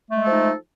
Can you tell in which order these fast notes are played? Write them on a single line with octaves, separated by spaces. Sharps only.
A3 G#3 A4 F3 D#4